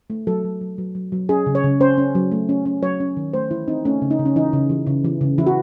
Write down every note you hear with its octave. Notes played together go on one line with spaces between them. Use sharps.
A3
F#3 A4
F#3
F#3
F#3
F#3
F#3
C#4 G#4
C#3
C#5
C#3
C#4 C5
C#4
F#3
A3
C#4
C#4
F#3 C#5
C#4
D#3
A3 C5
E3 E4
C4 D#4
A3 C#4
C#3
D#4
C#3
C#4
E3 D#4
C#3
E3
C#3
E3
C#3
E3 E4
F#4